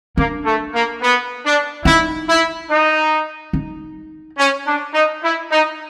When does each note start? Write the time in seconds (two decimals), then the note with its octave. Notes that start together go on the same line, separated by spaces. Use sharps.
0.16 A#3 D4
0.45 A3
0.74 A#3
1.01 B3
1.44 D4
1.85 D#4 E4
2.28 E4
2.69 D#4
3.53 D#4
4.38 C#4
4.67 D4
4.94 D#4
5.23 E4
5.50 D#4